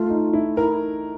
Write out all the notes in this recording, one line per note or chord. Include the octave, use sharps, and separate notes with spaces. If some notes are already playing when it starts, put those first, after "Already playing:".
Already playing: A3 F4
D#4
E4
E4 A#4